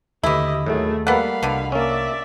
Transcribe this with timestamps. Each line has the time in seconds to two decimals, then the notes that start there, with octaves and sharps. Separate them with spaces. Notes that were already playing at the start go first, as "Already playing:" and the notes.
0.23 D#2 D3 E3 A3 E4 G4 D#5
0.66 D#2 A2 D#3 F#3 A3 G#4
1.07 G3 A#3 B3 A4 F5 F#5 B5
1.43 C2 B2 D3
1.72 A#3 C#4 D5 E5